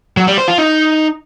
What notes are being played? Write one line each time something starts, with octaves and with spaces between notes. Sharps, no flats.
F#3
G3
C5
F4
D#4